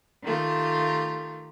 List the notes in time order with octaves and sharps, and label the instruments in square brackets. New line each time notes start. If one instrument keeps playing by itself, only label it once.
[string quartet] D#3 A3 F4 G4